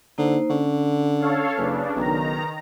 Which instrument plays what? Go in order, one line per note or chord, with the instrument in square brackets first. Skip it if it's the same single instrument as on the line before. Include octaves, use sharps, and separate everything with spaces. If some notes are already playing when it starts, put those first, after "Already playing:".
[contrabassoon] D3 [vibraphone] A#3 D#4 C5
[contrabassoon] D3 [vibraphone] C#4
[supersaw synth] A4 C#5 F5
[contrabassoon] F#1 [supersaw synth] C#3 D4 [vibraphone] B4
[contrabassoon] B1 [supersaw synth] D#3 A#5